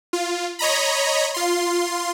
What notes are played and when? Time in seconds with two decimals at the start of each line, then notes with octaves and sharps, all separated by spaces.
0.13 F4
0.59 C#5 D#5 A#5 B5
1.34 F4 C6